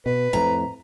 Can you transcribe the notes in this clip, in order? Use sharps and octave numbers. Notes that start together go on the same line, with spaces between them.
B2 B4
F2 A2 A#5